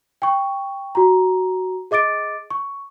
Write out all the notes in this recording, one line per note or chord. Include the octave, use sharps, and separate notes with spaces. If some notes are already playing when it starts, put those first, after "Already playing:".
G5 C#6
F#4 A#5
G#4 D#5 D6 A6 D7
C#6